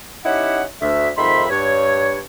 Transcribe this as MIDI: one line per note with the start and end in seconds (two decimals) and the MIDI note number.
0.25 0.62 61
0.25 0.62 63
0.25 0.62 64
0.25 0.62 67
0.25 0.62 78
0.81 1.09 38
0.81 1.09 76
1.17 1.47 41
1.17 1.47 44
1.17 1.47 51
1.17 1.47 76
1.17 1.47 83
1.17 1.47 84
1.49 2.21 43
1.49 2.21 73